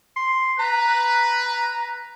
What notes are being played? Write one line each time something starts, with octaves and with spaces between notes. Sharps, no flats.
C6
B4 A#5